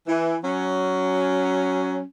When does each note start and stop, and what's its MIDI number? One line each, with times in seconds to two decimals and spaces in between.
0.07 0.36 52
0.44 2.01 54
0.44 2.01 61